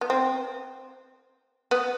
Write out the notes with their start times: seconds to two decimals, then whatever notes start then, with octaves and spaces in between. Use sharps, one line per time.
0.01 B3
0.10 C4
1.71 B3